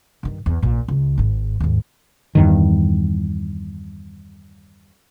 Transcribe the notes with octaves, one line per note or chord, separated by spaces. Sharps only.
G2 D#3
E2
A#1 A#2
C#2
G#1 G#2
D#2 G#2
E2 G2 D#3